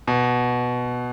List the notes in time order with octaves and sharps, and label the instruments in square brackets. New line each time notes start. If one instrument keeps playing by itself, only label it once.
[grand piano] B2